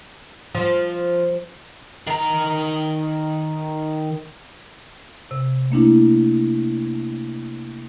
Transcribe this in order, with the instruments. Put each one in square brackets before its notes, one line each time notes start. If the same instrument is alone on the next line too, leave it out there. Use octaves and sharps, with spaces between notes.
[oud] F3
[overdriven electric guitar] D#3 A#5
[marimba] C3
A3 A#3 D4 E4